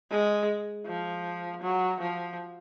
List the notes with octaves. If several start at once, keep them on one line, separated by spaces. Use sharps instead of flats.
G#3
F3
F#3
F3